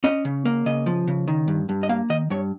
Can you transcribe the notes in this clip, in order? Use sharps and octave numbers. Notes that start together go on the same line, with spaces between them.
C#4 D#5
C#3
A#3
C#3 D#5
F3
C#3
D#3
G2
G2
D#5
A#3 F5
D#3 D#5
G2 C#5